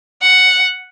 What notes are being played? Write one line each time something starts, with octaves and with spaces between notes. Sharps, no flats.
F#5